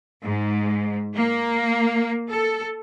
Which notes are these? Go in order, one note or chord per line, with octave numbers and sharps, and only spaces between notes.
G#2
A#3
A4